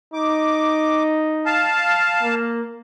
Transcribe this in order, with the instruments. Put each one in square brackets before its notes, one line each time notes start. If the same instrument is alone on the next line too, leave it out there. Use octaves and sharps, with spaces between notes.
[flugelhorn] D#4 [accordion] D6
[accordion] F5 A5
[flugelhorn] A#3